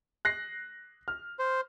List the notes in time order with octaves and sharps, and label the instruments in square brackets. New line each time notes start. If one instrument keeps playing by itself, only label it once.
[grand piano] F#6 A#6 C7
F6
[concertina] C5